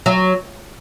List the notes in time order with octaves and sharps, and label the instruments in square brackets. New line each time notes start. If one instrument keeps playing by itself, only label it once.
[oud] F#3